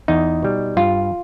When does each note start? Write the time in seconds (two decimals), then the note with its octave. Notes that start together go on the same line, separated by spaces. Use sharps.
0.08 E2 D#4
0.43 B2 G3
0.77 G2 F4